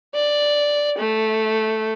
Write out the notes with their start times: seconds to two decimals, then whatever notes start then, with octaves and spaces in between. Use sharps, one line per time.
0.15 D5
0.98 A3